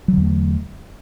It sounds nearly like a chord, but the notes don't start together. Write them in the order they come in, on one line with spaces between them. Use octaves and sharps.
F#3 D3 E2 A3